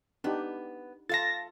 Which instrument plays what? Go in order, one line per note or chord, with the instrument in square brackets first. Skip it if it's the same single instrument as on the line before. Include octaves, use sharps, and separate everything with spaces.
[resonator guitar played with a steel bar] B3 [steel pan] D4 D#4 G4
[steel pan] F4 [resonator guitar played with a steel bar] A4 F5 A5 [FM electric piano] A6 A#6